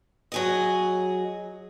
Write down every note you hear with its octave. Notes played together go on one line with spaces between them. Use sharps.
F#3 G#4 D#5